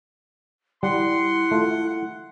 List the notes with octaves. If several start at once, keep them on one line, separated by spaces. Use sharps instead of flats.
G3 E4 F#5 C6
A3 F4